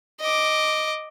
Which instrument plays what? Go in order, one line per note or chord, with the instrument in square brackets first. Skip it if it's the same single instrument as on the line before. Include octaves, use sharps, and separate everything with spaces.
[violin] D#5 D6